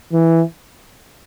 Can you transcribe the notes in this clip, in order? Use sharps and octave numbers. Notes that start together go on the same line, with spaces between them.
E3